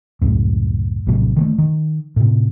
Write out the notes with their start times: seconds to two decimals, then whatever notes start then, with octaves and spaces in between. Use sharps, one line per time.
0.22 C#2 F#2 A2
1.07 A#1 A2 C3 F#3
1.36 D#3 G#3 A3
1.58 D#3
2.16 A2 C3